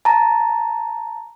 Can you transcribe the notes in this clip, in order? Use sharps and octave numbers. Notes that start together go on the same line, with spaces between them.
A5 A#5